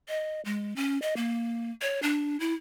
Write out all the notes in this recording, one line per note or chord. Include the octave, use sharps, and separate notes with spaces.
D#5
G#3
C#4
D#5
A#3
C#5
D4
E4